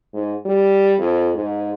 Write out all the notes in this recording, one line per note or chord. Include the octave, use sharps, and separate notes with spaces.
G#2
G3
F2
G#2